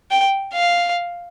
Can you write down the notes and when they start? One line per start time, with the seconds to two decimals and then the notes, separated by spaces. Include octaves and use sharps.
0.11 G5
0.53 F5